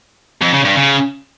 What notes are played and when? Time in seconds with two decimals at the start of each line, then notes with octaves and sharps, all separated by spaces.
0.42 F2
0.54 C#3
0.65 G2
0.77 C#3